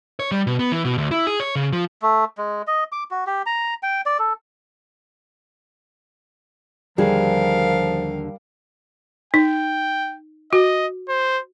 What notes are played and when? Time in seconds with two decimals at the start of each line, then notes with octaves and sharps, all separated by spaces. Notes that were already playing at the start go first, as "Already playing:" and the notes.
0.19 C#5
0.32 G3
0.47 B2
0.59 B3
0.72 E3
0.85 B2
0.98 D2
1.11 E4
1.27 G#4
1.40 C#5
1.56 C#3
1.72 F3
2.02 A3
2.38 G#3
2.67 D#5
2.92 D6
3.11 F#4
3.26 G4
3.46 A#5
3.83 G5
4.06 D5
4.19 A4
6.98 D#2 D3 F3 G3 G#4 A#4 F5
9.34 D#4 G5
10.53 F#4 D#5
11.09 C5